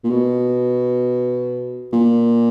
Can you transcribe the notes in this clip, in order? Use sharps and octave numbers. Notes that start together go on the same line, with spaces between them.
A#2
B2
A#2